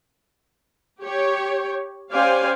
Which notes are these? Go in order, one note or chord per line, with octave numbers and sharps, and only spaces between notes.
G4 C#5
C#4 G4 C5 D5 F5 G#5